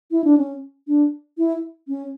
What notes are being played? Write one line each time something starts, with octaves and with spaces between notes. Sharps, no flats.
E4
D4
C#4
D4
E4
C#4